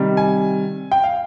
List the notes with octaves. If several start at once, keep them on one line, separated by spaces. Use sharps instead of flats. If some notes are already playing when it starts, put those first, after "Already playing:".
Already playing: C3 D#3 G3
G#5
G5
F5